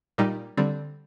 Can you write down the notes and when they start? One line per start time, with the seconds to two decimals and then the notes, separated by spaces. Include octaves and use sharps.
0.18 A#2 G3 A#3 D#4
0.57 D3 G3 C4